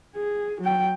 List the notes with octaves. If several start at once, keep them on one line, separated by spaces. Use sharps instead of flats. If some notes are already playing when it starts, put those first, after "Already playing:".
G#4
F#3 G5